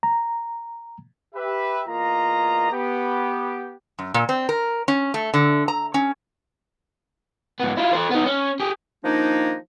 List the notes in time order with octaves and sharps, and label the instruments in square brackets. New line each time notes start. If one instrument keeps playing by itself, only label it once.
[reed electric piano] A#5
[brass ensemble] G4 B4 E5
E2 A#3 F4 D#5 A#5
B3 G4
[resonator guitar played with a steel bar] F#2
A#2
C4
A#4
C#4
A3
D3
A#5
C#4
[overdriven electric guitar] G#2 B3
E4 F4
A4 C5
B3 D#4
C#4
G4 G#4
[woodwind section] D#3 F3 A#3 D4 D#4